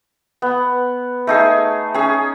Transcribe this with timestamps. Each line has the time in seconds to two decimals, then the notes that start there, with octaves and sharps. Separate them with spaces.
0.42 B3
1.27 A3 D#4 G#4
1.94 C#4 G#4